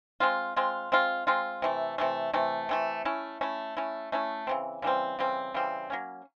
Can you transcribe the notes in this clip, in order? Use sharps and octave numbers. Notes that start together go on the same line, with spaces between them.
G#3 C4 F4
G#3 C4 F4
G#3 C4 F4
G#3 C4 F4
C3 E3 A3
C3 E3 A3
C3 E3 A3
C3 E3 A3
A3 C#4 E4
A3 C#4 E4
A3 C#4 E4
A3 C#4 E4
C#3 E3 G3 C4
C#3 E3 G3 C4
C#3 E3 G3 C4
C#3 E3 G3 C4
F#3 A#3 C#4